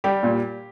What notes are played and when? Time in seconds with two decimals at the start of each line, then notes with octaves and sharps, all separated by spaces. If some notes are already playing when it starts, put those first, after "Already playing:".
0.04 G3 G4
0.23 A#2